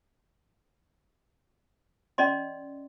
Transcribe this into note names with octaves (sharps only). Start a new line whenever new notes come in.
C#4 D5 D#5 C6